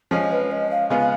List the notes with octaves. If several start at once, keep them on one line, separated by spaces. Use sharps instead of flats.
F3 G#3 C#4 D#5
B4
D#5
F5
C#3 G#3 B3 F4 F5